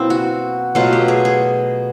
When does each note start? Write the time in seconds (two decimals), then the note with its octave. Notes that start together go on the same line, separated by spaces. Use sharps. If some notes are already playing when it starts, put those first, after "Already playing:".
Already playing: B2 F#3 A#3 C4 E4
0.10 F#4
0.75 B2 F#3 A3 F4
0.93 G4
1.08 G#4
1.25 G#4